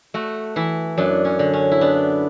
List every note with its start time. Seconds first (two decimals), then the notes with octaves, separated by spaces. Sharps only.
0.14 A3 F#4
0.56 E3 E4
0.98 F#2 D4
1.25 C#4
1.39 D3
1.53 C#4
1.71 E4
1.81 B3 D4